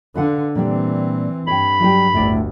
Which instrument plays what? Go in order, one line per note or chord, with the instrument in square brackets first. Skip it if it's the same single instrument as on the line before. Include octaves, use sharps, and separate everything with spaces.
[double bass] D3 [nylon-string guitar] B4 F5 F#5
[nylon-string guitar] A#2 G3 D4 [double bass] E3 C4
[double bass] G2 [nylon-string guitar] C#5 G5 [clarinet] B5
[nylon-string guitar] F#3 G3 G4
[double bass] G1 D2 [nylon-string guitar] A2 D5